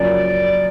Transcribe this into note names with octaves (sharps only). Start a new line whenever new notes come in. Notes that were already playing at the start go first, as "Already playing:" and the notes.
Already playing: F#2 C#3 F3 A#3 D5